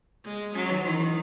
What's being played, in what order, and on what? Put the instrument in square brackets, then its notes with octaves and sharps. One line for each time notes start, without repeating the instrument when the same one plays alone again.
[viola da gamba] G#3
[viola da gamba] F#3 [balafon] C#4
[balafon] D#3 D#4
[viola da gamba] D#3 [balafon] E3 E4
[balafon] E3 E4